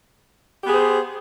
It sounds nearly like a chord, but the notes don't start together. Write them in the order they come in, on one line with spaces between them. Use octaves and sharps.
G4 B3 G#4 C5